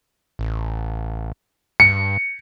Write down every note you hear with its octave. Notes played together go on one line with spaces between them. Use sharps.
A1
G2 C#7